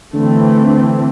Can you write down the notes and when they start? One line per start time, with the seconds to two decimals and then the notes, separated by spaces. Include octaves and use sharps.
0.13 D3 E3 A3 C4
0.68 D3